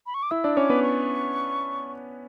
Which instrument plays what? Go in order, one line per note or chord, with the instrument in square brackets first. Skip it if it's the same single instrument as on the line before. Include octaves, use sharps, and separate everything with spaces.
[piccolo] B5
C#6
D6
[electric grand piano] E4 E5 [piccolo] E6
[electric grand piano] D4 D5
[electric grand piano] C#4 C#5 [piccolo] D6
[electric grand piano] B3 B4
[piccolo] C#6